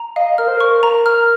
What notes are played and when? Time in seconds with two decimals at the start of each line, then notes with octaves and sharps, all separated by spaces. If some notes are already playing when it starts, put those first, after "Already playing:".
Already playing: A#5
0.16 D#5 F5
0.38 A#4 F6
0.48 C5
0.57 A#4 C#6
0.83 A#5
1.06 F6